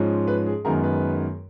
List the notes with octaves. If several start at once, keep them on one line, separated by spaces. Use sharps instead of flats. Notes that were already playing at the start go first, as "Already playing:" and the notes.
Already playing: G#2 F3 G#3 C#4
B4
G#4
F#2 D#3 G#3 B3 A#4
B4